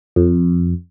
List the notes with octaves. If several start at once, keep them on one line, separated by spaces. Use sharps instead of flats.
F2